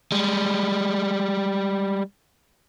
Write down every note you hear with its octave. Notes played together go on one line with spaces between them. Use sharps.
G3 G#3